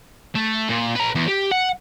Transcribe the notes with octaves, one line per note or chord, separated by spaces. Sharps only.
A3
A#2
B4 A#5
E2
G4
F#5